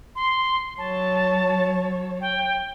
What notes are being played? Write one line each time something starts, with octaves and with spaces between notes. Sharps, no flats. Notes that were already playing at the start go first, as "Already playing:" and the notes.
C6
F#3 C#5 A5
G5